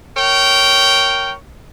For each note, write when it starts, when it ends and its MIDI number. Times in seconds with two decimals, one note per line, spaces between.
0.16 1.32 70
0.16 1.32 73
0.16 1.32 79